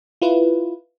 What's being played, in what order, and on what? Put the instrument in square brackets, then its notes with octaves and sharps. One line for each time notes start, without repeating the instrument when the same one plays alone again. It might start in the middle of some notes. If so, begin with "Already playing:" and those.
[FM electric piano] E4 F4 B4